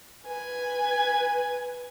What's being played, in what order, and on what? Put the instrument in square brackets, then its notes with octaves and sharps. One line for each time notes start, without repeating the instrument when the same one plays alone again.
[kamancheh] B4 G#5